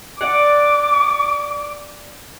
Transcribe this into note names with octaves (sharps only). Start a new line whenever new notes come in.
D5 F#5 D6